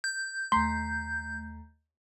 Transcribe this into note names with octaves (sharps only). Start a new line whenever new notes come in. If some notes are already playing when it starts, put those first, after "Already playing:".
G6
D#2 A3 A#5 C6 B6 C7